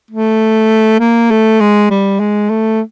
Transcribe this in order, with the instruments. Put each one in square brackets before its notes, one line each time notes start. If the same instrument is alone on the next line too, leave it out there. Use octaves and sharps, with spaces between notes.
[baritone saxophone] A3
A#3
A3
G#3
G3
G#3
A3